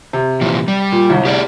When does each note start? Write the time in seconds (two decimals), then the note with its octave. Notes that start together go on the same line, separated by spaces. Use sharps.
0.13 C3
0.41 A#2 E3 F3
0.68 G3
0.92 A#2
1.10 G1 C2
1.25 G4 G#4 D5